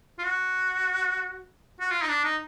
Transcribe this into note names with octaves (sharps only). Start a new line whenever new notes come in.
F4
F#4
F#4
F4
D#4
D4
D#4